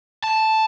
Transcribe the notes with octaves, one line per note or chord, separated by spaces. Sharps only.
A5